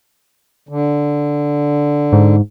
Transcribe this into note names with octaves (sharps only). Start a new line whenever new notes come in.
D3
G#2